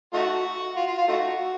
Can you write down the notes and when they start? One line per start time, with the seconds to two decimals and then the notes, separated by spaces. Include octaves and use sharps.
0.14 A3 D#4 F#4
0.77 F4
0.87 F4
0.98 F4
1.08 A3 D#4 F#4